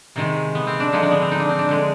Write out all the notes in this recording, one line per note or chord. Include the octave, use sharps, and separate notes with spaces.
C3 D#3 G#3
B3
C4
D4
D3 F3 G#3 D#4
D4
B3
C4
D#4
D4
C4
D4
D3 G#3